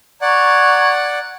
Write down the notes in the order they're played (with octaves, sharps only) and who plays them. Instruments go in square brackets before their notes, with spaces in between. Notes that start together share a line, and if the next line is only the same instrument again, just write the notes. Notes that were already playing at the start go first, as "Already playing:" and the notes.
[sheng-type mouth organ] D5 F#5 [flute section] A#5 C#6 G#6